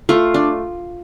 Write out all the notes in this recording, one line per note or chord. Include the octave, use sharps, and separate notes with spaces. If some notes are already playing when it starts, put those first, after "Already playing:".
A3 F4
D4